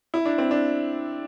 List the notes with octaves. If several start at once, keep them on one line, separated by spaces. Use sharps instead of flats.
E4
D4
C4
D4